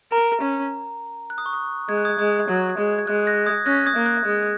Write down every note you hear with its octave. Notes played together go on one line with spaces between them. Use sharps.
A#4 A#5
C#4
F#6
D#6
C#6
D#6
G#3 G#6
F#6
D#6 G#6
G#3 D#6 G#6
F#3
G#3
G#6
G#3 F#6
F#6 A#6
D#6 G#6
C#4 F#6 A#6
D#6 G#6
A#3
F#6
G#3